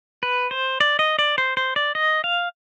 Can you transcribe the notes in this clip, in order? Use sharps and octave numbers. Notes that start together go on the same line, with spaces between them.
B4
C5
D5
D#5
D5
C5
C5
D5
D#5
F5